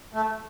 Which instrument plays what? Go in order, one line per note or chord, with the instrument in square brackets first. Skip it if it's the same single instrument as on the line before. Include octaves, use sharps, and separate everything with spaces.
[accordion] A3